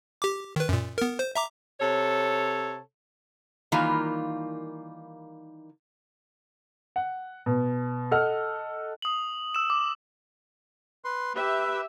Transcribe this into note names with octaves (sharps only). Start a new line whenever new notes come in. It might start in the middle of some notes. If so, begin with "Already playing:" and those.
G4 D6
D#3 B4
F#2 A#2
B3 A#4
C5
E5 A#5 D6
C3 A4 C#5
D#3 E3 G3 A#3 F4
F#5
B2
A4 D#5 F#5 F6
D#6 F#7
E6 E7
D6
B4 C6
G4 B4 E5